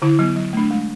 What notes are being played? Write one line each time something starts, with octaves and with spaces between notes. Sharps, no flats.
D3 E4
F#3 B3
F#3
A3 D4
G#3